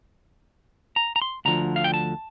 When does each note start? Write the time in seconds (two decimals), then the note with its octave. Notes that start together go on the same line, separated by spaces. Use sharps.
0.96 A#5
1.16 A#5
1.22 C6
1.45 D2 D3 F3 A#5
1.76 F5
1.84 G5
1.94 A5